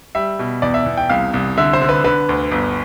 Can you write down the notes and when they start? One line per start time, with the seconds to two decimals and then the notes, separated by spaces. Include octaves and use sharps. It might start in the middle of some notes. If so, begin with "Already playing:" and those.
0.15 G3 E5
0.39 B2
0.62 E2 D5
0.74 E5
0.86 E2
0.97 G5
1.10 C2 F5
1.34 C2
1.57 D3 E5
1.73 C5
1.81 D3
1.89 B4
2.04 D3 B4
2.29 D2
2.52 G1